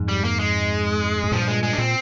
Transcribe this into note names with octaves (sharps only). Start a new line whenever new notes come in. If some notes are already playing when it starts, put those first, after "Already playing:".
Already playing: F2 G#2
G3
A#3
G#3
G#2
G2 A#2 F3
G#3
G#3
D4
A#2 C4